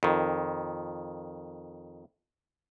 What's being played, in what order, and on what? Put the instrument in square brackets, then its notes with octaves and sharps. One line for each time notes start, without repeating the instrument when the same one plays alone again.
[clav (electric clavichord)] F2 D#3